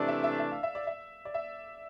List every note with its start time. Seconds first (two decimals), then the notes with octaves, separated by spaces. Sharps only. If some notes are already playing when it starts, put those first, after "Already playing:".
Already playing: C3 E3 A3 D4 D5
0.08 E5
0.24 E5
0.39 E5
0.51 F5
0.63 E5
0.75 D5
0.87 E5
1.25 D5
1.34 E5